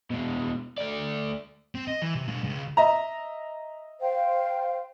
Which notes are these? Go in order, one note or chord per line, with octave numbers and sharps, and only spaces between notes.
B2 G#3
A3 D5
C4
D#5
E3
C3
G#3 D4
C#2
D#5 E5 A#5
C5 F5 G5